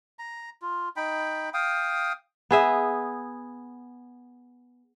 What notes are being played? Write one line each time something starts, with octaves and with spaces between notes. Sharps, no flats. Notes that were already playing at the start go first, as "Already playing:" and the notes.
A#5
F4
D#4 G5 B5
F5 G5 D#6
B3 G#4 E5